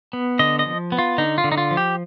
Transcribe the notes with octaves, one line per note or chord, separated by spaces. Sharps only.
B3
D3 D#5
D#5
F3
B3
F4
D3 D#4
F4
D3
D#4
F4
F3
G4